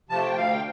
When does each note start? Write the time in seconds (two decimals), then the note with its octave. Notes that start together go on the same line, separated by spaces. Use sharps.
0.09 C3 F3 A3 A5
0.23 G5
0.33 D2 F5
0.51 G5